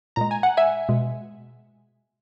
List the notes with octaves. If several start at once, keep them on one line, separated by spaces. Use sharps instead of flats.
A#2 G#3 A#5
G#5
F#5
E5 G#5
B2 G#3